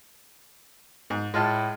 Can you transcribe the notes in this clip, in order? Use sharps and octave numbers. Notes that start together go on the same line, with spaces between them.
G#2
A2 G#3 F4 A5